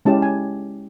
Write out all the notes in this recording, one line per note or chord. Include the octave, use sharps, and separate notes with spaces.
G#3 C#4 E4 G4 A5
G#5